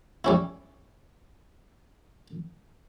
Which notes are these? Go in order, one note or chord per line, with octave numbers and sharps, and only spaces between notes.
G3 C#4 E4